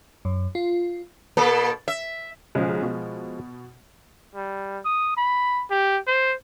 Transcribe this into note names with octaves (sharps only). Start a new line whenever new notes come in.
F#2
F4
B2 A#3 A4
E5
B1 C#3 F3 G#3
B2
G3
D#6
B5
G4
C5